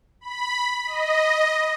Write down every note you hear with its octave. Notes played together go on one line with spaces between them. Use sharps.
B5
D#5